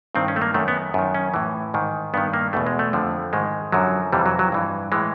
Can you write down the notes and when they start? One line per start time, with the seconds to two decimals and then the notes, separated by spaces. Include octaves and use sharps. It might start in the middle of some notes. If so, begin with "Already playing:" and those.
0.15 G2 D#3 C4
0.28 C#4
0.36 A3
0.42 A#3
0.54 F#2 D#3 A3
0.68 B3
0.94 F#2 D#3
1.14 C#4
1.34 A2 E3
1.74 G#2 D#3
2.14 G2 D#3 B3
2.34 A#3
2.53 E2 B2 A3
2.67 G#3
2.79 A3
2.93 F2 D3 F3
3.33 G#2 D#3 G#3
3.72 F#2 D3 F3 F#3
4.12 F2 C3 E3 G3
4.26 F#3
4.39 F#3
4.52 G2 E3
4.92 A2 E3 G#3